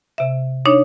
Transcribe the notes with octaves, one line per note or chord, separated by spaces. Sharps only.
C3 E5
D4 D#4 C#5